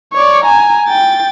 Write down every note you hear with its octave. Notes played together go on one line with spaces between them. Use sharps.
C#5 D5
G#5 A#5
G5 A6